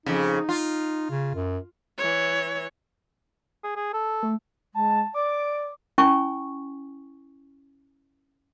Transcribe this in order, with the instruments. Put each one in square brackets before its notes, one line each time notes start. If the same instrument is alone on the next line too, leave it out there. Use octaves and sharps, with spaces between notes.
[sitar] F2 C#3 [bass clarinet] D#4
[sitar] F4
[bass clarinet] C#3
F#2
[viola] E3 C#5
[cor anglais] G#4
G#4
A4
[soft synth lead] A3
[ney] G#3 [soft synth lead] A5
[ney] D5 [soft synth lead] D6
[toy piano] C#4 E4 G#5 C#6